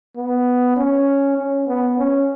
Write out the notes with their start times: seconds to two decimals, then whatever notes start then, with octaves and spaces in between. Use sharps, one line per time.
0.16 B3
0.76 C#4
1.37 C#4
1.67 B3
1.98 C#4